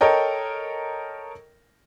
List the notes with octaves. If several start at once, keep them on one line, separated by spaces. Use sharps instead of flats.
A4 A#4 C#5 D#5 G5